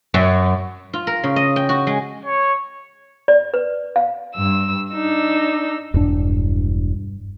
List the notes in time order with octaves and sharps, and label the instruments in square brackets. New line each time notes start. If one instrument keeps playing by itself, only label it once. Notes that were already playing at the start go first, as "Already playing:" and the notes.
[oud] F#2
[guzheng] F4
A#4
C#3
D#5
G5
F#4
G#3
[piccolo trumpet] C#5
[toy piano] D5
B4
F5
[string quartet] G2 E6
D4 D#4 E6
[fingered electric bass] E1 D4 [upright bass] G2